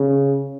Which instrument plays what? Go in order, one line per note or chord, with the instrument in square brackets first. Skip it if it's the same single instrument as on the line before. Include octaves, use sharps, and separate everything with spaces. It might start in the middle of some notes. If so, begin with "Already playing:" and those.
Already playing: [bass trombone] C#3